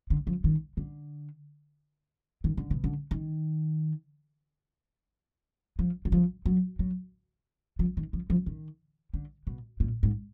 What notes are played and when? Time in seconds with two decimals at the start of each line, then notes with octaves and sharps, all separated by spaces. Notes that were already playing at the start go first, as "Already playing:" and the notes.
0.10 D3
0.27 F3
0.44 D#3
0.77 D3
2.44 D#3
2.57 D3
2.70 B2
2.84 D3
3.11 D#3
5.79 F3
6.05 F#3
6.12 F3
6.46 F#3
6.79 F#3
7.79 F3
7.97 D#3
8.13 F3
8.30 F3
8.46 D#3
9.14 D3
9.47 B2
9.80 A#2
10.03 G#2